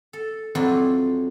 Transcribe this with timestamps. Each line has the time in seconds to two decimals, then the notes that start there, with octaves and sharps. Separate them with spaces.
0.13 A4
0.55 F2 F#3 C4 D4 E4 F4